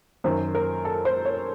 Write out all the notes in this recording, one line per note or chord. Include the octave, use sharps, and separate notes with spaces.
F#2 D#3 C5
A#4
A4
C5
C#5